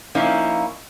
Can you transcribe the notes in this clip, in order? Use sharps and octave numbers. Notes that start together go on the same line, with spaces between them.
F3 A#3 C#4 D#4 E4